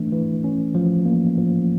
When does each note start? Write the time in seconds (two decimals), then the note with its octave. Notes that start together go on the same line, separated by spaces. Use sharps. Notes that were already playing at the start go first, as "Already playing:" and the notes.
Already playing: E3 A3 D4
0.12 E3
0.44 C#4
0.75 F3
1.05 A#3
1.37 F3